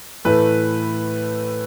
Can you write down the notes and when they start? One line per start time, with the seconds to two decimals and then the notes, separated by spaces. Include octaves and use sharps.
0.25 A2 E3 A3 B4